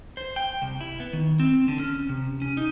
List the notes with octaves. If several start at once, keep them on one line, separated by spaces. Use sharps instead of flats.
C5
G5
C2
E4
B3
D#3
C4
D3
C#4
C3
C#4
D#4